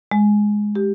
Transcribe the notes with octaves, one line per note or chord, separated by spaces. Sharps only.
G#3
G4